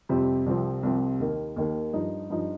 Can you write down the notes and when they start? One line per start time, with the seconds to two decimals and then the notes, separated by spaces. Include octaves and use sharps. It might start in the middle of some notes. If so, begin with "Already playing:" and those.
0.09 F2 C3 G3 C4 G4
0.46 C2 C3 F3 C4
0.83 C2 C3 F3 C4
1.20 D#2 D#3 A#3
1.56 D#2 D#3 A#3
1.93 G2 F3 D#4
2.30 G2 F3 D#4